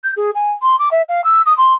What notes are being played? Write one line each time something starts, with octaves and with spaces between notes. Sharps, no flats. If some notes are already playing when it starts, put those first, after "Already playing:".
G6
G#4
G#5
C6
D6
E5
F5
E6
D#6
C6